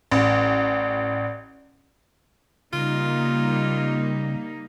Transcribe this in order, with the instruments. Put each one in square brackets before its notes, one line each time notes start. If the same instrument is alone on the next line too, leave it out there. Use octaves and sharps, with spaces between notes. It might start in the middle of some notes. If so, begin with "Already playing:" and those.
[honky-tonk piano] A1 [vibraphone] D5 F#5
[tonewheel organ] C#3 [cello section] G3 A#3 D#4 [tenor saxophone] F4